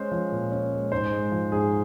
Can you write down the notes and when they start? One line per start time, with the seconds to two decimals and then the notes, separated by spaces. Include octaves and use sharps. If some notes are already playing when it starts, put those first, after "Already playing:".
Already playing: G#3 C#4 C5
0.11 F3
0.32 A#2
0.52 C#4
0.71 G#3
0.92 G#2 C5
1.12 G#3
1.32 F3
1.52 G#2 G#4